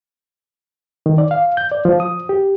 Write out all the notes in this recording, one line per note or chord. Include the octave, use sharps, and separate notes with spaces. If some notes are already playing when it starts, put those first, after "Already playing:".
D#3
D5
F5
G6
D5
F3
D#6
G4